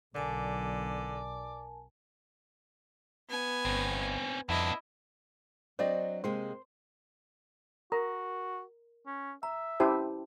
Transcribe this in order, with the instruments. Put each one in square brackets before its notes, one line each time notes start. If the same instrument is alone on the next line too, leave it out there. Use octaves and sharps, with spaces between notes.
[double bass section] B1 [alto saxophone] D3 [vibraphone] A#4 G#5 A5 [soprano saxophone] D5
[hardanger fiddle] B3 G#5
[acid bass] G1 [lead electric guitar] C4 C#4
[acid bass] F2 [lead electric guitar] B3 D4 [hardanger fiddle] E4 D#5
[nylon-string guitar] F#3 C4 D4 [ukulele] C5 D5 D#5
[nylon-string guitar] C3 G#3 A#3 [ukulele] C5
[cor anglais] F#4 [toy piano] A#4 [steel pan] A#5
[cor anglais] C#4
[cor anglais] E5 [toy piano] A#5
[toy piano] C#4 A5 [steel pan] E4 G4 C5